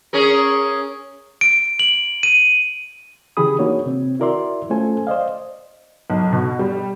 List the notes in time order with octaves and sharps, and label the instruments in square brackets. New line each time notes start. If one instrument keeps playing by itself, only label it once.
[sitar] C#4 G#4 A#4
[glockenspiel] D7
F#7
D#7
[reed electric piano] C#3 E3 G4 G#4 B5 D#6
A#3 D4 D#4 F#4 C#5
C3 C4
E4 F#4 A#4 D5 E5 C6
A3 C#4 F4 A4 C5 G#5
C5 D5 D#5 F5
[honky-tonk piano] B1
B2
G3